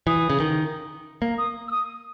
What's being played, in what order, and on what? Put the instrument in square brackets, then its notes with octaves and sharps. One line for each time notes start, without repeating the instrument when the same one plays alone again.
[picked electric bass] E3 [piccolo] D#6
[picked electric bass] C#3
D#3
A#3
[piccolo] D#6
E6
D#6